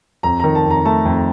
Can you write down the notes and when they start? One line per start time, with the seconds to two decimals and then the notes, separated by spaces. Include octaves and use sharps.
0.23 F2 A#5
0.40 D#3 A#5
0.55 A5
0.65 F2
0.70 A#5
0.85 A3 A5
1.05 F2